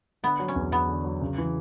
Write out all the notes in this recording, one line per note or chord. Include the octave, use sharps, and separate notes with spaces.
D3 B3
F#3
C#4
E2
E2 B3
D3
F#3
C#3
E3